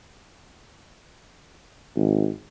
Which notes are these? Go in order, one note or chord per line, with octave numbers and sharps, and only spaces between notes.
G#1